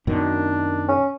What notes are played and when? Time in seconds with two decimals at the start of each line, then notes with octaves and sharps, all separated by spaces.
0.07 F#2 B2 D#3 D4
0.88 C#4